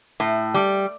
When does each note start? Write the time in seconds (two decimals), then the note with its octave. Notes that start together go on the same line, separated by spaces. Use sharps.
0.20 A2
0.54 G3